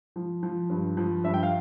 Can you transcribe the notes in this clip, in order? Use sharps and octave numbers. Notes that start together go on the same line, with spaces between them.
F3
F3
G2
F3
G2 E5
G5
F5